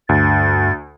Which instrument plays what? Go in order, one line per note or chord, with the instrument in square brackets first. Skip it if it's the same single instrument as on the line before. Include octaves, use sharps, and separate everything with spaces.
[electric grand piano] D2 [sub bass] G2 [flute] A6